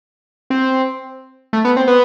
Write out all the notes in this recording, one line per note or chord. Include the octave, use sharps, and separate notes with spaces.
C4
A3
B3
C4
B3